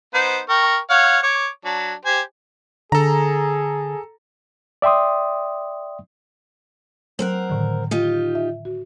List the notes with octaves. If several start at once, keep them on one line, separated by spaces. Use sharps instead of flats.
B3 D#4 C5
A#4 G5 C#6
C#5 F5 F#5
C#5 D6
F#3 D4
G4 C5 G#5
D3 G#4 A4 A#5
D5 E5 G5 C6 D#6
F#3 C4 A#4 F#5
A2 D3 D#3
D#4 F4 G4
E5
F#4